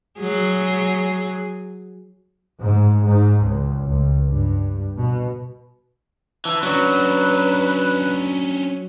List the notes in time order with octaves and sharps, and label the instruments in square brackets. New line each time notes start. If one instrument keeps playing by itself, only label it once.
[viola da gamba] F#3 G#4
[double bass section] G#2
G#2
C#2
C#2
G2
B2
[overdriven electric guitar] E3 [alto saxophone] A5
[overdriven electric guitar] F#3 [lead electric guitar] C#4 D4 [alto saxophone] B4